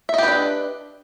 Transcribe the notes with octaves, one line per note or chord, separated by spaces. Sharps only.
D4 G4 B4 D#5 E5